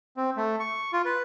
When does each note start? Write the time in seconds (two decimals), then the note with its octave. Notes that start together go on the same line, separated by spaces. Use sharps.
0.17 C4
0.37 A3
0.60 C#6
0.93 F4
1.05 B4